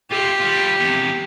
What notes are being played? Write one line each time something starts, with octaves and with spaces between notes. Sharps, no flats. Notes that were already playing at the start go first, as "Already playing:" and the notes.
F4 G4 E5
G3 F4
E2 C3